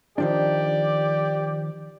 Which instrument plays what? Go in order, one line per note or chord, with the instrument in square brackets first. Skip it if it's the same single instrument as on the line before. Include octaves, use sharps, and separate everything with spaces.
[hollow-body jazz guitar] D#3 F3 D4 [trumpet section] G4 D5